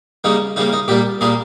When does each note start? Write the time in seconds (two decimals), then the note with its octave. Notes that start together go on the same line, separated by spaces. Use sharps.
0.24 C#3 G3 A#3 D#4
0.56 C#3 G3 A#3 D#4
0.73 D#4
0.88 A#2 G3 A#3 G4
1.21 A#2 G3 A#3 G#4